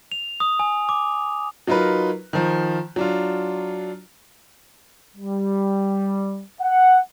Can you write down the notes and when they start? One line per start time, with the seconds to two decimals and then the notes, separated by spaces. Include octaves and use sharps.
0.12 F7
0.40 D#6
0.59 G#5
0.89 D6
1.67 F#3 D#4 F4 A#4 B4
2.33 D#3 F3
2.96 F#3 D4 F4
5.16 G3
6.60 F#5